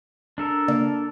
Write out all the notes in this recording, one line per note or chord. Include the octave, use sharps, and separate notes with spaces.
D4 A4 A#4
C#3 A#3 D5